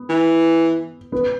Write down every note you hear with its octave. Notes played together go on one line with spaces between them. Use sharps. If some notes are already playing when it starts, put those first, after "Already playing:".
Already playing: B3
E3
B3